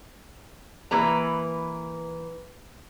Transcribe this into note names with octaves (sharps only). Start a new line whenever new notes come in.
E3 A#3 B4 A#5